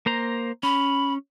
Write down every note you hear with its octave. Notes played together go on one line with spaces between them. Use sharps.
A#3 C5 A#5
C#4 B5